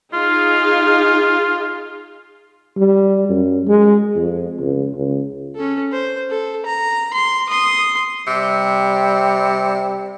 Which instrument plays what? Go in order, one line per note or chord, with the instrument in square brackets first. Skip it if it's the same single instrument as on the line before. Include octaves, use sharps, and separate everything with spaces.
[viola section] D#4 G#4 F5 [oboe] F4
[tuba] G3
F#2
G#3
F2
C#2
C#2
[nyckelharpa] C#4 A4
C5
A4
A#5
C6
C6 D#6
[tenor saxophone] C3 [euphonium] G3